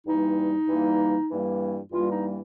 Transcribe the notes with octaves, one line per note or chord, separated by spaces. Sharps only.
G2 E3 G3 A#3 D#4
G2 E3 G3 A#3
G2 E3 G3 A#3
G2 E3 G3 A#3 F4
D#4